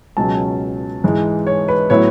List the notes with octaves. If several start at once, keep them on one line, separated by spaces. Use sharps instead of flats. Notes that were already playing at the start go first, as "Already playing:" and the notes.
C#2 B2 F#3 C#4 A5
G#2 E3 G#3
C#5
B4
A2 F#3 B3 E4 C#5